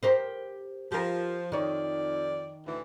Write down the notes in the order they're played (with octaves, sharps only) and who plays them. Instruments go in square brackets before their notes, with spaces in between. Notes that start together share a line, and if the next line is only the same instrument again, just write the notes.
[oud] G4 A#4 C5
[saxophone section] F3 [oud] G4 A#4
[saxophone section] F2 D5 [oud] D#3 C#5
[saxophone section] D2 A2 E3